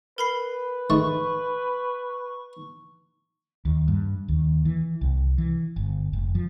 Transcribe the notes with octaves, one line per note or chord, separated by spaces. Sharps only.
A#4 B4 B5 C7
G#2 D#3 A3 C#6
D#2
G2
D#2
E3
C2
E3
G1
F1
F3